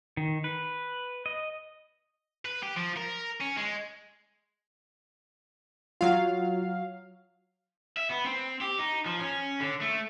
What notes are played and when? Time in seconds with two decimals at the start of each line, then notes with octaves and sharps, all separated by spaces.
0.17 D#3
0.44 B4
1.26 D#5
2.45 B4
2.63 G4
2.76 F3
2.97 A#4
3.41 C#4
3.57 G#3
6.01 F#3 F4 F5
7.97 E5
8.10 B3
8.25 C4
8.61 G4
8.79 D#4
9.06 F3
9.20 C#4
9.60 D3
9.81 A3